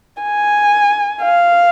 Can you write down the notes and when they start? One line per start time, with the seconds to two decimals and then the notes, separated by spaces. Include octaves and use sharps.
0.23 G#5
1.21 F5